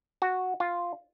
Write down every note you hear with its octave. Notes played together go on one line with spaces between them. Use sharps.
F#4
F4